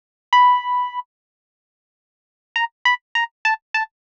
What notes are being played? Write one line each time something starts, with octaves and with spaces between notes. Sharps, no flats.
B5
A#5
B5
A#5
A5
A5